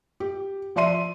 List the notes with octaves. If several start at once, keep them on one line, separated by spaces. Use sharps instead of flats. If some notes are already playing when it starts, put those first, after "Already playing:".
G4
F3 D5 E5 C6 D#7